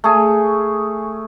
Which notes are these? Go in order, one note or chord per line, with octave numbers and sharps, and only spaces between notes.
A3 G#4